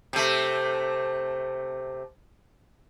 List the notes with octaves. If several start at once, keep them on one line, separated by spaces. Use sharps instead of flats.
C3 A3